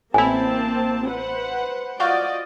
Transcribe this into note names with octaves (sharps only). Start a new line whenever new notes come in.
A1 A#3 C4 E4 G#5 A5 B5
B4 C5 F#5
F4 F#4 D5 D#5 F5 G6